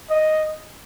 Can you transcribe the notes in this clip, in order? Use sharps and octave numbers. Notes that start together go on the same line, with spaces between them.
D#5